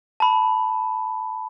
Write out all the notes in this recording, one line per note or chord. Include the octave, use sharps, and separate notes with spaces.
A5 B5